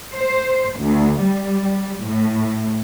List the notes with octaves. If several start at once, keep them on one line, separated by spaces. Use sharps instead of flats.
C5
D2
G3
A2